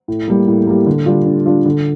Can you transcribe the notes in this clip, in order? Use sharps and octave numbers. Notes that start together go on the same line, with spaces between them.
A2
G3 A#3
A2
G3 A#3
D3
G3 D4 F4
D3
G3 D4 F4
D3